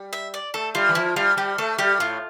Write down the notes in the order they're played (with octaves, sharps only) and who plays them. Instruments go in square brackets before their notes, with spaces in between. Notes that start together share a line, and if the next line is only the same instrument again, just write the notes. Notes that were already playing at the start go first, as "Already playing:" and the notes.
Already playing: [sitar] G3
[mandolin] E5
D5
[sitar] A3 [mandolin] A4
[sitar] G3 [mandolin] F4
[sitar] E3
[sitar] F3 [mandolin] E4
[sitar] G3 [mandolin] F4
[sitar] G3 [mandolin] G4
[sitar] A3 [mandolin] A4
[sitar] G3 [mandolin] G4
[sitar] A2 [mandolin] F4